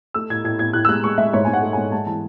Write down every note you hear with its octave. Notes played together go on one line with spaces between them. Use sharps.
A3 E6
A2 G#6
A2 G#6
A2 G#6
A2 F#6
E6
G#3 F#6
G#3 C#6
G#3 E5
G#2 C#5
G#2 G#5
F#5
A3
G#2 G#5
G#3 A5
E3 A5